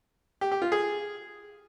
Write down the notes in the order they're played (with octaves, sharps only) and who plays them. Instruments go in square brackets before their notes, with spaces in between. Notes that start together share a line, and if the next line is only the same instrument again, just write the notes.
[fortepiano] G4
G4
F4
G#4